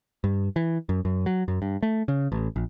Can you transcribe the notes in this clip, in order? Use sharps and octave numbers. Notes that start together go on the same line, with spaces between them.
G2
E3
F#2
F#2
F#3
F#2
G2
A3
C#3
A1
A#1